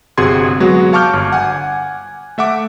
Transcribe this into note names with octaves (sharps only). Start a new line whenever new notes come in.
G1 C3 F#4 G#4 C6 G#6
F#3 G#3 B3 F#4
F5 A5 C#6 D6 F6 G6
G1
F#5 G#5
A3 E5 F#5 D6